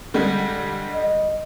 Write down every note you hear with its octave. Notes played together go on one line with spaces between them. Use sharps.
D3 G3 G#3
D#5